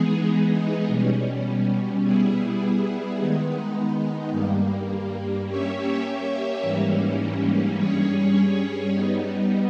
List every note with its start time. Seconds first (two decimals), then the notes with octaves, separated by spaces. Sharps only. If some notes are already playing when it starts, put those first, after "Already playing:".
Already playing: E3 G#3 B3 D#4 G#4
0.86 B2 G3 C#4
2.01 G3 B3 E4 G#4
3.16 D#3 G#3 B3 D#4
4.31 G2 G3 A#3
5.46 A#3 C#4 G4 C#5 E5
6.62 G#2 E3 G3 A#3 C#4
7.77 G2 G3 C#4 G#4 C#5
8.92 G3 B3 D#4